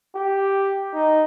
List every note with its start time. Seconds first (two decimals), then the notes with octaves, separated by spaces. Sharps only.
0.16 G4
0.94 D#4